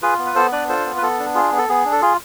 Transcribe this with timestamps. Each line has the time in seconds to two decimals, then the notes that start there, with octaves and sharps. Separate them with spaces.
0.02 F4 G#4 B4
0.19 B3
0.26 B4
0.35 B3 A4 C5
0.52 D4 B4 D5
0.69 F4 A4 C5
0.86 B3
0.98 B4
1.02 B3 A4
1.19 D4
1.35 F4 G#4
1.52 B3
1.58 A4
1.69 B3 G#4
1.86 D4
1.92 A4
2.02 F4 G#4